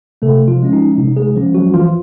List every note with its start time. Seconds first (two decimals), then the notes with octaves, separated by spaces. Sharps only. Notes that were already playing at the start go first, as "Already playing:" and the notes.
0.22 C3 A3 A4
0.48 F3 F4
0.60 F3 G#3 C#4
0.73 D#4
0.98 C3 D#4
1.17 G#3 G#4
1.36 F3 G#3 C#4
1.55 F#3 F#4
1.74 E3 F3 F4